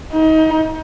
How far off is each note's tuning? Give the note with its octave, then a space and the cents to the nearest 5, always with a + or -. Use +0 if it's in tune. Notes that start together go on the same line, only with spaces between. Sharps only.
D#4 +30